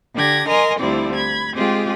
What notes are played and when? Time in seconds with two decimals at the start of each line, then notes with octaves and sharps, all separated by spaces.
0.14 D3 D4 G4 G#6 A#6
0.48 A#4 D#5 G#5 A#5 C6
0.80 D2 F3 G3 C4 E4 D5
1.14 B5 G#6
1.56 G#3 C4 F4 G4 G#4